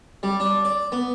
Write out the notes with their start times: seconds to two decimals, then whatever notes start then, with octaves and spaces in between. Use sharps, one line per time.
0.23 G3
0.40 D4
0.65 D5
0.92 B3